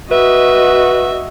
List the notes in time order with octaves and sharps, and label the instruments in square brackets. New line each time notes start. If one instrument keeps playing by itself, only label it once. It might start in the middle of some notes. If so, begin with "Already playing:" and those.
[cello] F#4 D#5 [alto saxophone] B4 [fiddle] E5